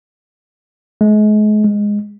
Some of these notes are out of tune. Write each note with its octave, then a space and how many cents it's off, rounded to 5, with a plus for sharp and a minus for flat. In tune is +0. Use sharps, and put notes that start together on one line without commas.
G#3 +35
G#3 -10